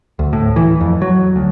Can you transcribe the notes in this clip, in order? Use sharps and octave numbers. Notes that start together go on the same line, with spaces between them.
D2
A2
E3
F2
F#3
D2